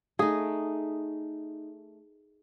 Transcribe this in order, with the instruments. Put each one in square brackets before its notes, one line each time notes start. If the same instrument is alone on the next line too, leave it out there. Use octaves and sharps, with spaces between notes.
[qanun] A3 D#4 [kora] G#4